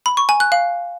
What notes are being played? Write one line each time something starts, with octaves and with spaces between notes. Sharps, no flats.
B5
C#6
G#5
F#6
F5